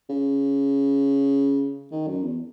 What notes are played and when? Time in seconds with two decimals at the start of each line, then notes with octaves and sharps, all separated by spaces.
0.09 C#3
1.91 D#3
2.07 F#2
2.22 E2